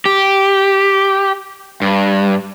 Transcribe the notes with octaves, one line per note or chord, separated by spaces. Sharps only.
G4
G2